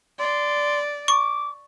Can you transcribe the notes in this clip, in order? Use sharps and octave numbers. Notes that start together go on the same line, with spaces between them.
D5 C6
C#6 D6